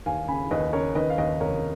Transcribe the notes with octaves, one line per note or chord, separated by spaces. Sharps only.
D#2 F5 G#5
C#3 G#5 B5
D#2 B4 D#5
C#3 A#4 C#5
D#3 B4 D#5
F5
D#2 B4 D#5
F1 A#4 C#5